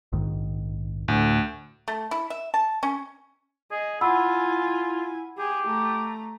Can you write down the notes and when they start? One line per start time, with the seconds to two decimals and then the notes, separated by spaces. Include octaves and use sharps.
0.13 A#1 G#2 D#3
1.08 D2 A2
1.88 A3
2.11 E4
2.30 E5
2.54 A5
2.83 C#4
3.71 G#4 D#5
4.01 E4 F4 F#5 G#5 B5 E6
5.38 G4 G#4
5.67 A3 A#5